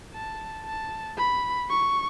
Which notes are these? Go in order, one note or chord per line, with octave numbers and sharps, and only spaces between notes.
A5
A5
B5
C#6